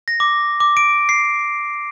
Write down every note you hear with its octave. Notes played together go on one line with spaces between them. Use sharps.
A#6
D6
D6
D7
C7